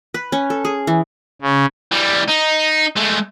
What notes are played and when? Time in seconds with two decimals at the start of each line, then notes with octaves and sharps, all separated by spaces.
0.14 B4
0.32 C#4
0.50 A4
0.65 G#4
0.87 E3
1.42 C#3
1.92 E3 G3
2.28 D#4
2.96 G#3 A3